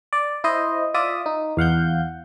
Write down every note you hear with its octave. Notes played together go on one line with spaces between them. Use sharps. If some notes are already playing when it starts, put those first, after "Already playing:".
D5
E4 C5 D#5
F4 D5 E5 D#6
D#4
E2 F5 F#5 G6